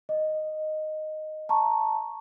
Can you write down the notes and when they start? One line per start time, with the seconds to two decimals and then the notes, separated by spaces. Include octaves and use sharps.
0.09 D#5
1.49 A5 A#5 C#6